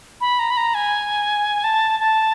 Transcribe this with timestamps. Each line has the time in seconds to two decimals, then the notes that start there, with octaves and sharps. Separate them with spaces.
0.21 B5
0.39 A#5
0.50 B5
0.57 A#5
0.74 G#5
1.64 A5
2.00 A5